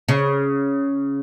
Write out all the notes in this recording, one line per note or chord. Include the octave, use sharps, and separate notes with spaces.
C#3